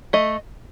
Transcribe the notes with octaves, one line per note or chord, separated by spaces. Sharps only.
A3 D#5